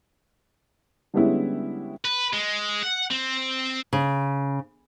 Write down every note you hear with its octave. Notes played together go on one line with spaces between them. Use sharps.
D3 G3 G#3 B3 C#4 E4
B4
G#3
F#5
C4
C#3